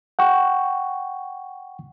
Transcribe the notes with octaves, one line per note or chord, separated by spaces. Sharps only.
F#5 G5 C#6